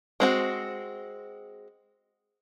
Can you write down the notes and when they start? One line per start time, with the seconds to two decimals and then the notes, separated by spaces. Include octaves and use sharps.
0.20 G#3 C4 F#4